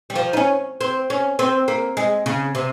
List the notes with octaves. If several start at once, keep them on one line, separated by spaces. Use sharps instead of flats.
G3
F3
D#4
C#4
C4
C#4
C4
A#3
G#3
C#3
C3